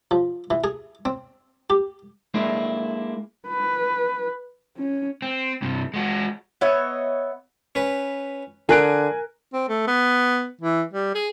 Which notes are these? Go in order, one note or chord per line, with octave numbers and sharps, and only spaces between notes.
F3
E3
G#4
C4
G4
G#3 A#3 D4 E4
B4
C#4
C4
G2 C3
G#3 F#4
B3 C#5 D#5 E5
C#4 B4
D3 G#4 A#4 G#5 F#6 D7
C4
A3
B3
E3
G3
G#4